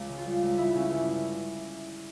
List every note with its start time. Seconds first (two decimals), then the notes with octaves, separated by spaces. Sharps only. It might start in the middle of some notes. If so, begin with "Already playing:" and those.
Already playing: C#2
0.09 C#3
0.18 F4
0.26 G3
0.43 C#2
0.58 C#2 E4
0.75 C#3 C#4
0.90 G1 E4